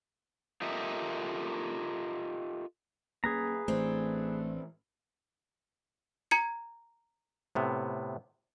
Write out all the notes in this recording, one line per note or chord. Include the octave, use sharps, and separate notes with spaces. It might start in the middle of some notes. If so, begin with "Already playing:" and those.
F4 G4 A4 A#4 D#5 E5
A#3 C#4 G#4 B4 A#5
A1 E3 A3 C4 D4
A#5 G#6 C#7
A2 C3 B3